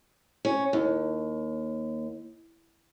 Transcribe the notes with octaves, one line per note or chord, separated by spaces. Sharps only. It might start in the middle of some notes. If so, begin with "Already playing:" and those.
C#4
D#2